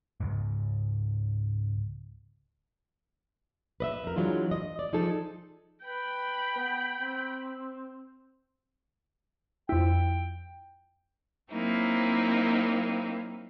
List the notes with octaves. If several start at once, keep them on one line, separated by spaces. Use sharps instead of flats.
C#2 G#2
B4 D#5 E5
F2 A#4
E3 F#3 G#3 D4 F4
D#5
D5
F3 D#4 G#4 A4
B4 G5 B5
B3
C4
F2 E4 G5
F#3 A#3 C4 D#4 E4